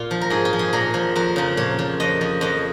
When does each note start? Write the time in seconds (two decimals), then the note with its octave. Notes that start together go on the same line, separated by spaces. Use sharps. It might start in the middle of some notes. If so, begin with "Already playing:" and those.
Already playing: A#2 F4
0.11 F3
0.21 A#4
0.30 G#2 G#4
0.45 F4
0.53 F3
0.59 G#4
0.73 A#2 A#4
0.94 F3
1.16 F2 A#4
1.36 C#3 F3
1.57 A#2 C#5
1.79 F3
2.00 F2 D#5
2.21 F3
2.41 F2 D#5